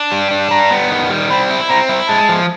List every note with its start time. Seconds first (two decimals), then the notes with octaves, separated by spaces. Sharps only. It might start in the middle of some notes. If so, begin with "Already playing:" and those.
Already playing: D4
0.12 G3
0.31 D4
0.51 G3 A#5
0.71 B3
0.90 D#3
1.10 G3
1.30 C4 B5
1.50 E4
1.69 C4 A#5
1.89 E4
2.09 G#3 A5
2.29 F3